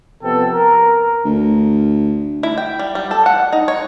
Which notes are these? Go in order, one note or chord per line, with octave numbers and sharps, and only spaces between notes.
C3 F3 B3 A4 G5
A#4
D2
E4
G5
G3
G3
A4
F#5
D#4
C#5